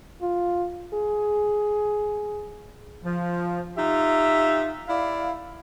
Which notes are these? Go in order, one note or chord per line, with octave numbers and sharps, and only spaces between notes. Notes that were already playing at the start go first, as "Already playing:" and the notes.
F4
G#4
F3
D#4 F4 G4 E5
E4 D5 F5